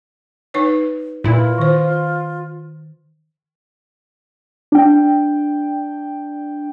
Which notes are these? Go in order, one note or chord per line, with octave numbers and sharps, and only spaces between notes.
D#4 B4 C#5
A#2 E4 F4 B4
D#3 C5
D4 G5